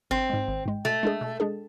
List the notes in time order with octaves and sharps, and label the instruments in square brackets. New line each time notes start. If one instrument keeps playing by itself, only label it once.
[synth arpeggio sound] G#1 [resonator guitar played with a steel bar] C4
[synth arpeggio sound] G#2 G#3
G#1
G#2 G#3
[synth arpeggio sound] B2 [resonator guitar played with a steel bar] A3
[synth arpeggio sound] G#3 D4 G#4
B2
G#3 D4 G#4